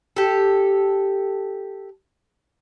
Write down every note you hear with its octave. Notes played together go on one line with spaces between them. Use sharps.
G4 A4